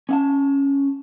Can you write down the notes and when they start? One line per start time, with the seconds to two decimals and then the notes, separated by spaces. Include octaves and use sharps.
0.09 C#4 F5 A5